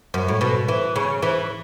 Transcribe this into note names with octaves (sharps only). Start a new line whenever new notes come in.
F#2
A2
B2
E3
C#3
E3